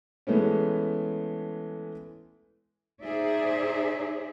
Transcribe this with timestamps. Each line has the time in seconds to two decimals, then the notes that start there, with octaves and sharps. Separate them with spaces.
0.27 E3 G#3 A3 B3 C#4
3.03 D#4 G#4 C5 D5 E5